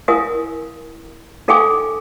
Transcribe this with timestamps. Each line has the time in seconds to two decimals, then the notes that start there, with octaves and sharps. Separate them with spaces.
0.08 E4 A#4 F5 G#5 D#6
1.48 D#4 A4 F5 G5 G#5 D6